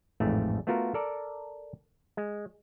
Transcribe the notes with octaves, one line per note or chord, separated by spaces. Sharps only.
A1 F2 G#2 A3
A3 B3 F4 F#4 A#4
A4 A#4 D5
G#3